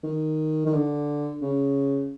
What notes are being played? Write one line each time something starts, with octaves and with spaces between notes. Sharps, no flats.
D#3
D#3
D3
C#3